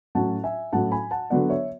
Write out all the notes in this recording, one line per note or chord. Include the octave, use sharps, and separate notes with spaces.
A2 F#3 C#4 F#5 A5
E5 G#5
A2 F#3 C#4 F#5 A5
G#5 B5
F#5 A5
D3 F#3 B3 D5 F#5
C#5 E5